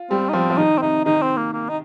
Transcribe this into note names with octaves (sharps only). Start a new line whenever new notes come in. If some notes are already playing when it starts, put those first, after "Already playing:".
Already playing: F4
G3 C4
D#4
F3 C4
F3
D#3 D#4
C4
C3 D#4
D#3 D#4
C4
A#3
A#3
D#4